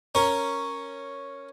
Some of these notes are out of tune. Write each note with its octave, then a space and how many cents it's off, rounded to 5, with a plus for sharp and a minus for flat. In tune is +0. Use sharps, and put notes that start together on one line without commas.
C#4 +0 A#4 +0